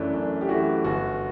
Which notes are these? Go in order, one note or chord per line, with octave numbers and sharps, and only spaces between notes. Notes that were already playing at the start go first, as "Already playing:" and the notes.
Already playing: F#2 E3 A3 C#4 D4
F#2 D4
G4
E3 A3 F#4
G1 F#4